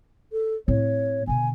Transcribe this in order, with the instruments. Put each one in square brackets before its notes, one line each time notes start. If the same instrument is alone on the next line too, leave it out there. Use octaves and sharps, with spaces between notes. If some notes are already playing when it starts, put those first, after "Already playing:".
[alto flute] A4
[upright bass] A2 C4 [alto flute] C#5
[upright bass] B2 D3 [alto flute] G#5